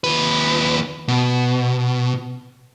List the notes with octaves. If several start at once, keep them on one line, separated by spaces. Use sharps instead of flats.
D#2 B4
B2